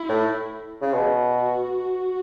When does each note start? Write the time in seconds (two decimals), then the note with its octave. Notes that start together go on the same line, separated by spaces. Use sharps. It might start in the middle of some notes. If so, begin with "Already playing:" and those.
Already playing: E4
0.09 A2
0.82 C#3
0.93 B2 F#4